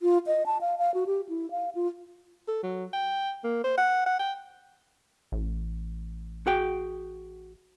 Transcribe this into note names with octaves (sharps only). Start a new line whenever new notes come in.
F4
D#5
A5
F5
F5
F#4
G4
E4
F5
F4
A4
F#3
G5
A#3
C5
F#5
F#5
G5
A1
F#4 G#4 G5